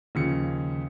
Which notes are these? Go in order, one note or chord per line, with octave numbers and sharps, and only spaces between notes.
D#2 C#3 F3 C#7